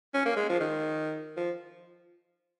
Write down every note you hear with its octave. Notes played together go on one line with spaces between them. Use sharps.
C#4
A#3
G#3
F3
D#3
F3